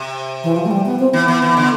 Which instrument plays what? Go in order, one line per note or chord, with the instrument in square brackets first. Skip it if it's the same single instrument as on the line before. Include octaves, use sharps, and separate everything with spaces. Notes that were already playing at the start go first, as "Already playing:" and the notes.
Already playing: [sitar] C3
[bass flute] E3
F3
A3
G3
B3
C4
[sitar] E3 [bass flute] B3
[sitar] E3
E3
D3